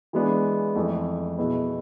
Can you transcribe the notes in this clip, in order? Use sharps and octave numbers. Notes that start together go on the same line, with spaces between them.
E3 G#3 B3 D4
F2 E3 A3
B2 B3 E4 G#4